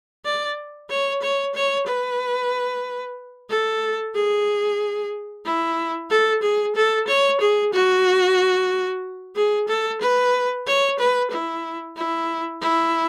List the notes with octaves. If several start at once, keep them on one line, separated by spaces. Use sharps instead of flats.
D5
C#5
C#5
C#5
B4
A4
G#4
E4
A4
G#4
A4
C#5
G#4
F#4
G#4
A4
B4
C#5
B4
E4
E4
E4